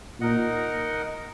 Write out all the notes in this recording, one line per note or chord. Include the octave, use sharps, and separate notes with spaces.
A#2 D#4 A#4 D#5 F#5